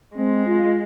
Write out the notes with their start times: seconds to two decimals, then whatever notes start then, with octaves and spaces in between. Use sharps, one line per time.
0.16 G#3 C4
0.46 F4